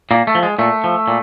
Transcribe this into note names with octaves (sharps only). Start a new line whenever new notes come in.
A#2 A#3
A3
F3
G#3
A#2 A3
F3
A#2